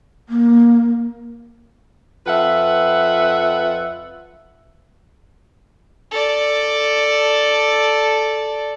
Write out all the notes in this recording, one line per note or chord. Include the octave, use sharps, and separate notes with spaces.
A#3
F2 F4 B4 E5 F#5
A4 D5